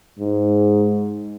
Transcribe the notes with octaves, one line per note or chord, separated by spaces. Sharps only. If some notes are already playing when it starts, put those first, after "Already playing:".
G#2